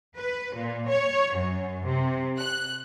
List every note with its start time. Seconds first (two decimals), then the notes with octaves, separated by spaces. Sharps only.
0.15 B4
0.55 A#2
0.87 C#5
1.35 F#2
1.86 C3
2.38 F#6